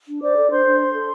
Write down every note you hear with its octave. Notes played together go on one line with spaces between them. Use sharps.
D4
C5 D5 D6
A4
D4 C5 C6
D4
C5
A4